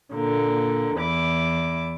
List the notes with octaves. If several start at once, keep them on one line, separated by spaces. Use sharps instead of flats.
A#2 D3 A#3
E2 E4 D6